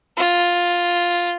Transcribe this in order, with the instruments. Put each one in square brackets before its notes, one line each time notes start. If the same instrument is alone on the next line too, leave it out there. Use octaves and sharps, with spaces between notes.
[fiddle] F4